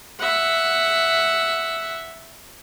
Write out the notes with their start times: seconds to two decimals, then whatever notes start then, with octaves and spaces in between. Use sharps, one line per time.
0.19 E5 F#5